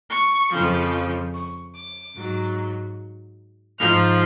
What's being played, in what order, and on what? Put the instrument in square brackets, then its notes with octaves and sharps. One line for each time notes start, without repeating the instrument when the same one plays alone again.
[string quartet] C#6
F2 C#3 F3
C#6
D6
G#2 F#3
G#2 F3 F6